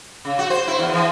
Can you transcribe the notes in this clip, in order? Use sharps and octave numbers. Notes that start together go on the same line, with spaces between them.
C#3
F#4
C5
E4
E2
E3